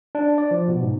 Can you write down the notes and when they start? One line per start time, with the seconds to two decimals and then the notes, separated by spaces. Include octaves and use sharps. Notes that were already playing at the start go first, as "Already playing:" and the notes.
0.15 D4
0.38 D5
0.51 F3
0.68 B2
0.83 G#2